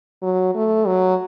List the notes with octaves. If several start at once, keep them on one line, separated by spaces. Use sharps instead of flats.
F#3
A3
F#3